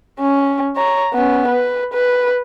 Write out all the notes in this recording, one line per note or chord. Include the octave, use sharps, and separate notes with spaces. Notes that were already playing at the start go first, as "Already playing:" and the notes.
C#4
C#5 A#5
B3 C#4
B4
B4